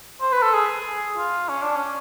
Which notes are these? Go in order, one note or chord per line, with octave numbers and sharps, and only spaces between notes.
C5
B4
A4
G#4
F4
C#4
D4
C#4